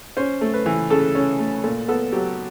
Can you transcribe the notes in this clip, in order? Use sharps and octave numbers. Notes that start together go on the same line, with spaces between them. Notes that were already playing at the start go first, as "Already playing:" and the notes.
C#4 C5
A3
B4
E3
C#3 A4
C#4
A3
A#2 A4
B3 A4
F#3 G4